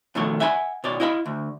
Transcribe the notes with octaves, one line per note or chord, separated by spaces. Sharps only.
B2 D#3 F3 A3 C#5
E5 F#5 G#5 A#5 B5
B2 C#5 D5
E4 D#5 F5 F#5 B5
D2